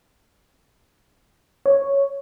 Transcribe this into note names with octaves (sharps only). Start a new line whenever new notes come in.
C#5